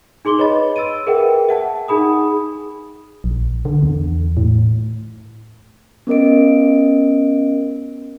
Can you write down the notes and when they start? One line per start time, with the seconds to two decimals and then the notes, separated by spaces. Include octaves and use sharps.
0.25 D#4 G#4 C6 D6 G7
0.38 B4 C#5 D#5 B5 A6
0.76 E6 A6 D7 D#7
1.07 G#4 A#4 B4 E5 F#5 G5
1.49 E5 F#5 A5
1.88 D#4 G#4 B5 D#6
3.24 A#1
3.65 D3
3.83 E2
4.37 A2
6.07 B3 C#4 A#4 D#5 D7